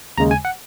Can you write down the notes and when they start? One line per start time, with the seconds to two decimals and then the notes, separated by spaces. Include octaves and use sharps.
0.18 D#2 C#3 G#3 A#5
0.31 G#5
0.45 F#5